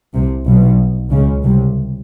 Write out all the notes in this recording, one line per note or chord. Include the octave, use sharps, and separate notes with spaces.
C2 C3
B1 B2
C#2 C#3
C2 C3